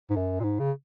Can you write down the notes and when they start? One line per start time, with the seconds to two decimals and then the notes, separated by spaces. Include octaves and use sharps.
0.10 G#2
0.16 F#2
0.40 A#2
0.43 G#2
0.59 C#3